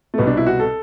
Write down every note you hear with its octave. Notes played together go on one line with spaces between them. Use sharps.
A3
C2 B2 B3
D4
E4
F#4
A4